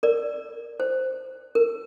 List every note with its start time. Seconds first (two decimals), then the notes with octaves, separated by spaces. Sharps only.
0.03 A#4 D5
0.80 C5
1.55 A#4